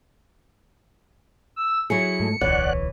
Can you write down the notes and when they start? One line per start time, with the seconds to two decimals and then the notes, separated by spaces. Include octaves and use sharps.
1.56 E6
1.90 F#3 E4 G#4 C#7
2.20 G#2 A3
2.41 D1 B1 E3 C#5 D5 F#5 F#6